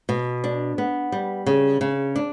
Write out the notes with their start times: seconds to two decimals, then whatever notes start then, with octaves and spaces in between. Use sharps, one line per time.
0.09 B2
0.44 D4
0.78 B3
1.12 G3
1.46 C#3
1.81 C#3
2.16 D4